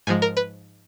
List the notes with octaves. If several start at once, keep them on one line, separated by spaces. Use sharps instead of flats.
G#2 F3 G#3 G#5
A#4
B4